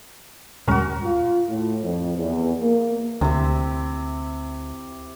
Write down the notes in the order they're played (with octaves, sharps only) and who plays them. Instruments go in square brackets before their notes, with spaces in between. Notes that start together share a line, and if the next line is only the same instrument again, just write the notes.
[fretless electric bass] D#1 D2 G2 [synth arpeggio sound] A#2 G#3 C#4 [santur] F#4 A#4
[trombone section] F4
A2
F2
E2
A#3
[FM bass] D2 [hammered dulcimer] C3 E4 G4